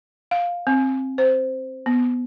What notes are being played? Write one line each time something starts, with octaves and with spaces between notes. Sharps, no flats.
F5
C4
C5
B3